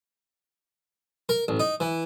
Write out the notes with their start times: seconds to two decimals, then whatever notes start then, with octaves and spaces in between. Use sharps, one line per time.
1.29 A#4
1.48 A1
1.60 D#4
1.80 E3